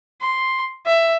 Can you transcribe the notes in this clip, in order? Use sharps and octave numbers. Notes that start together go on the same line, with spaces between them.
C6
E5